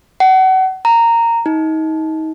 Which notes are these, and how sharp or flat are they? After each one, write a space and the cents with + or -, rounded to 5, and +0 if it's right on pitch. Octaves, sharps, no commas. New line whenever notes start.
F#5 +30
A#5 -10
D#4 +30